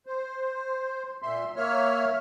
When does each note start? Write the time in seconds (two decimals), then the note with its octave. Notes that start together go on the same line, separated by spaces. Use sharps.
0.06 C5
1.22 A#2 E5 C6
1.56 A#3 C#5 E5 F6